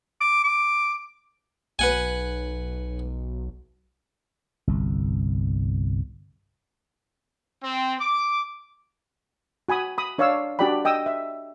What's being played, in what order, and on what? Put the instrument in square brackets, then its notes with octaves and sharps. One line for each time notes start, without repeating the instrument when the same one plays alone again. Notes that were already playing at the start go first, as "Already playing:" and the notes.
[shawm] D6
D6
[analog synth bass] B1 [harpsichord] B4 F#5 G#5
[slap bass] G1 C2
[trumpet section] C4
D6
[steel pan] F#4 G#5 B5 D#6
B5 D#6
D4 C#5 D5 F5 C#6 E6
D4 F#4 G4 D5 G5 B5
D#5 G5 D#6 E6
E5